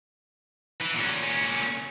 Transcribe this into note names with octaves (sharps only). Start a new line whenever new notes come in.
E3
A#2 C#4